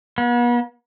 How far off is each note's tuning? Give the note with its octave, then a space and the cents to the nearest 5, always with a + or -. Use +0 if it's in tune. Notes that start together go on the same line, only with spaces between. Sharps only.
B3 -40